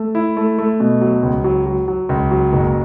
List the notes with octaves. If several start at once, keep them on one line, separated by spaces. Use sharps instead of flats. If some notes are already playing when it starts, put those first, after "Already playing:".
Already playing: A3
E4
A3
A3
B2
F#3
C#2
F#3
F#3
F#3
C#2
F#3
F#1